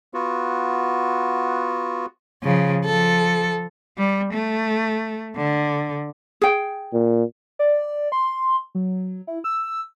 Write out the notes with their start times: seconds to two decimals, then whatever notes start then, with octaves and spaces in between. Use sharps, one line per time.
0.14 B3 F4 F#4
2.43 C#3 F3
2.85 F3 A4
3.98 G3
4.33 A3
5.36 D3
6.42 G#4 G5
6.93 A#2
7.59 D5
8.12 C6
8.75 F#3
9.27 E4
9.44 E6